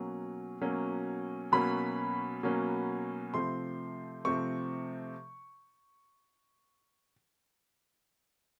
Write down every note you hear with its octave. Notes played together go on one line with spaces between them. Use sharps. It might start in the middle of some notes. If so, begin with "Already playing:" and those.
Already playing: B2 F#3 A#3 C#4
B2 F#3 A#3 C#4
B2 F#3 A#3 C#4 B5
B2 F#3 A#3 C#4
C3 F3 A3 C4 C6
C3 F3 A3 C4 C#6